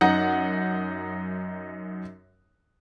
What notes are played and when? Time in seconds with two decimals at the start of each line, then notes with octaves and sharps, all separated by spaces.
0.01 F#2 D#4 F#5